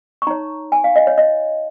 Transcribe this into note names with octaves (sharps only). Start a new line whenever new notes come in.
C#6
D#4 C#5 A#5
G#5
F5
D#5
C#5
D#5